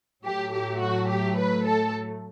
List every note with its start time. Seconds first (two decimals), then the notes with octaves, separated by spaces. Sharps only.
0.24 A2 F#3 A3 G4
0.53 G4
0.80 F#4
1.09 G4
1.37 B4
1.65 A4